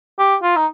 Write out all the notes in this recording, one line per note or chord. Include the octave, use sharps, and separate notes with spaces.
G4
F4
D#4